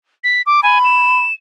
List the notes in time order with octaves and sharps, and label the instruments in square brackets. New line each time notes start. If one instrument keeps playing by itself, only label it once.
[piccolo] B6
D6
[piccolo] G#5 [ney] B5
[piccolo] E7